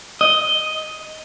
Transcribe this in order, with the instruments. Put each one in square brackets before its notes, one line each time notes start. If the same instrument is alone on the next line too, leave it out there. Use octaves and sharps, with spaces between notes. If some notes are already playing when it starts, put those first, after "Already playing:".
[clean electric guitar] D#5